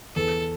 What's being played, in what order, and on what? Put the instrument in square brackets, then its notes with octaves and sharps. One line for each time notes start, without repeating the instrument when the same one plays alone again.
[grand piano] E2 [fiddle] A4